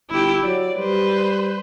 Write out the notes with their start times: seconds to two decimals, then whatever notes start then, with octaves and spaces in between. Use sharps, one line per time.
0.10 G1 E4 G4
0.43 F#3 D5
0.78 G3 B4 C5